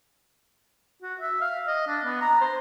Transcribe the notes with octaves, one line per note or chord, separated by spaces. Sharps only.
F#4
E5
F5
D#5
D4
B3
A#5
C5